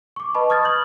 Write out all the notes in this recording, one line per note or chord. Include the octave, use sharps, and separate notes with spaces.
C#6 D6
B4 D#5 A5 B5
C#6 D#6 F6 G#6 A6
D#6 G6 F#7